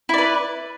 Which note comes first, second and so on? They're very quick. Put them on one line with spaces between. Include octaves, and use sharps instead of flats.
E4 D5 B4